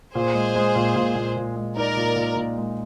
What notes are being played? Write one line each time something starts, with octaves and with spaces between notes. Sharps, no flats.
A#2 G#4 C5
G#3
G#3
A#2
A#2
A#2
A#2
G#3
D#4 A#4 D5
A#2
A#2
A#2
G#3